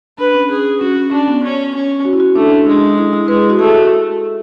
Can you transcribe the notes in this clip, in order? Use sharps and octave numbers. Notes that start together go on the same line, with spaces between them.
D4 B4
C#4
C#4 G#4
C#4 F#4
C#4
C#4 D4
B3
C#4
C#4
F#4
E4
F#4
A3 D4
D4
G#3 D4
E4
E4
G#3 B4
F#4
A3 G#4
F#4